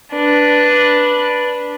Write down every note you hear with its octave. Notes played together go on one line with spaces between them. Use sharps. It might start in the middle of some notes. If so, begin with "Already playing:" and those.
D4 B4